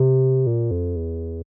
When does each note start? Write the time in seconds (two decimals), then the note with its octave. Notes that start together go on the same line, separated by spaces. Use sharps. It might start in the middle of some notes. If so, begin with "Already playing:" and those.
Already playing: C3
0.47 A#2
0.71 F2
0.96 E2